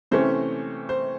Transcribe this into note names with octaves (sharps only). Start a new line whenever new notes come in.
C3 E3 A3 C#4 C5
C5